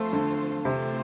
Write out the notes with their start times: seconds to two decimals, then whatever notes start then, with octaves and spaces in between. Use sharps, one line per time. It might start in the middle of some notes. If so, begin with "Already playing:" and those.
Already playing: F3 A3 C4 F4 C5
0.13 D3
0.65 C3 E3 A3 C4 F4 C5